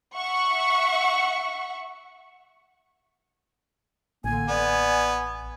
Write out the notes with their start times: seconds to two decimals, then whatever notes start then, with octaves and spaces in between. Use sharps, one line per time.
0.15 E5 F#5 C#6
4.24 A1 D3 A#3 G#5
4.48 B3 D5